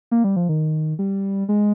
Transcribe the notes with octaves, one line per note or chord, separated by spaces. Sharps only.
A#3
G3
F3
D#3
G3
G#3